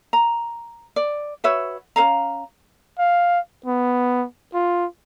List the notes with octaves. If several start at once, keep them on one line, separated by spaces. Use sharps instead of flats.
A#5
D5
F#4 B4 C#5 E5
C#4 C5 F5 A#5
F5
B3
F4